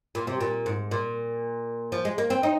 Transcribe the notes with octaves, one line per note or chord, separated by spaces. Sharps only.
A#2
C3
A#2
G#2
A#2
F3
G#3
A#3
C4
D#4